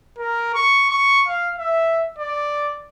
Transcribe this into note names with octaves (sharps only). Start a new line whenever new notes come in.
A#4
C#6
C#6
F5
E5
D5